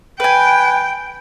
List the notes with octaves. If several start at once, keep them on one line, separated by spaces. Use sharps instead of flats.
B4 G5 G#5